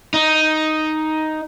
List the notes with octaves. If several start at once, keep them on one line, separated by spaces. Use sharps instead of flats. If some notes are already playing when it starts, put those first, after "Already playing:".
D#4